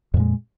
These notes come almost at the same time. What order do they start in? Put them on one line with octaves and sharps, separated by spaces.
F2 A#2 G#3